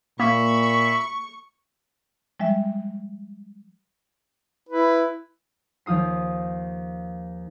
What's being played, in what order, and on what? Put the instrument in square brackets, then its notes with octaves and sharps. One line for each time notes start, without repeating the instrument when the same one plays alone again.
[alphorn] A#2 [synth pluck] A#3 [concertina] E5 B5 [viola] C#6
[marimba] F3 G3 G#3 E5
[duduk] E4 [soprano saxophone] B4
[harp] D#2 F3 F4 D#6 C7